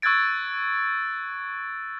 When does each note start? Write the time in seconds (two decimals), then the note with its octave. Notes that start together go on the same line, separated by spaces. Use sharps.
0.02 C#6 E6 F#6 G#6 A6 D7